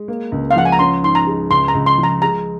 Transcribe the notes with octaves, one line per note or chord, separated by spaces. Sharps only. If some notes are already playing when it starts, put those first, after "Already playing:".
Already playing: G#3
A#3
C#2
F5
F3 F#5
G#5
A#5
C#4 C6
G#2 C6
A#5
G#3
C#2 C6
A#5
C#2
C6
F3
A#5
G#3 A#5